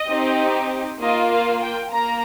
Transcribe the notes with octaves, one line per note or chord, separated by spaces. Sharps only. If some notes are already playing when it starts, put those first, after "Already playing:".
Already playing: D#5
C4 D#4 G4
A#3 F4 D#5
F5
G5
A#3 A#5